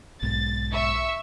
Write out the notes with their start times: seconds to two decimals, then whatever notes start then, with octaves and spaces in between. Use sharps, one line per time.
0.23 B1 G#2 A6
0.73 E5 C#6 E6